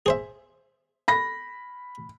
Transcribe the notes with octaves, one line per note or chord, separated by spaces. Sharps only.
G#4 C5 E5
B5 A#6